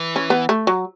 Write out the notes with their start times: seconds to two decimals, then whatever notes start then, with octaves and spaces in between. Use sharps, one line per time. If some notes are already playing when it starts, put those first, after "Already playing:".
Already playing: E3
0.16 C#4
0.30 B3
0.49 A3
0.67 F#3